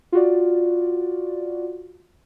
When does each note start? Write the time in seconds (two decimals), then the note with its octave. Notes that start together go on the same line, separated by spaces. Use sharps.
0.12 F4 F#4 D5